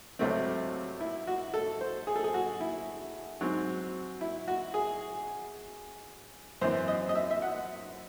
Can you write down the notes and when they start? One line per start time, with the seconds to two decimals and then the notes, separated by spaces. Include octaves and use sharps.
0.19 C#2 C3 F#3 A3 C4
1.01 E4
1.27 F#4
1.54 A4
1.81 C5
2.07 G#4
2.16 A4
2.24 G#4
2.34 F#4
2.61 E4
3.41 G#2 F#3 C4
4.21 E4
4.48 F#4
4.74 G#4
6.61 F#2 E3 C4 C5
6.88 D#5
7.09 D#5
7.15 E5
7.31 E5
7.42 F#5